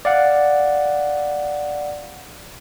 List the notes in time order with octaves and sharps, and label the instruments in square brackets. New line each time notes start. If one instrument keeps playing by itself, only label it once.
[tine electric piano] D5 F5 F#5